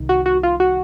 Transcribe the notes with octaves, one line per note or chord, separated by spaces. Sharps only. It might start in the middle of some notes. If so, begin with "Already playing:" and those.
Already playing: C2 D#3
F#4
F#4
F4
F#4